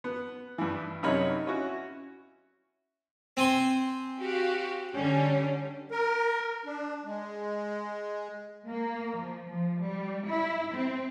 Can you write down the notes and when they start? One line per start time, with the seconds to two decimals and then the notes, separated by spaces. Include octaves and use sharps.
0.04 B3
0.58 G2 E3
1.03 F#2 C3 D#4 C#5 B5 F6
1.47 C#4 E4 F#4
3.37 C4 G#5 C6
4.20 F#4 G4 F5
4.95 D3 G3 C#4
5.91 A#4
6.66 D4
7.05 G#3
8.68 A#3
9.18 F3
9.49 F3
9.82 G3
10.28 E4
10.74 C4